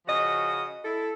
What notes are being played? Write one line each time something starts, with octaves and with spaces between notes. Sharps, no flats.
C#3 F3 F#4 D#5
E4 A4